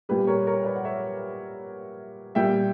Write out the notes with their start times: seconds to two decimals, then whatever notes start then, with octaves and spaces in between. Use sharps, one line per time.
0.09 A#2 G3 G4 B4
0.27 A#4 C#5
0.47 A#4 C#5
0.65 B4 D5
0.76 F#5
0.85 C#5 E5
2.35 A#2 G3 E5 G5